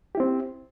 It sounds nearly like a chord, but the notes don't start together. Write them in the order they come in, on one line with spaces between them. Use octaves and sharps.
G4 E4 C4